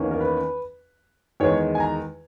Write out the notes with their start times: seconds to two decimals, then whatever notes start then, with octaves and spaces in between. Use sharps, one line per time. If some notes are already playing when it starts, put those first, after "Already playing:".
Already playing: E2 D#3 A#3 C#4
0.11 A#4
0.21 B4
1.40 E2 D#3 G#3 C#5
1.75 G#5
1.80 A#5